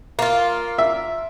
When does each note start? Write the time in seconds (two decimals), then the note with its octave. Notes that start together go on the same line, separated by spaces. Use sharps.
0.19 A#3 F4
0.78 E5